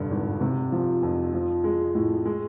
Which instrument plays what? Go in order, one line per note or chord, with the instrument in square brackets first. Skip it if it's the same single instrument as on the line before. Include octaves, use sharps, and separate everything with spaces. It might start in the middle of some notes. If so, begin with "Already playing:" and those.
Already playing: [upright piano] F1 G2 D3
G#1
C3
F3
F2
F3
G#3
A2
G#3